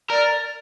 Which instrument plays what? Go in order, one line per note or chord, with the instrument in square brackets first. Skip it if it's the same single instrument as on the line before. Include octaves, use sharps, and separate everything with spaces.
[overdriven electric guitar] A#4 [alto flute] D5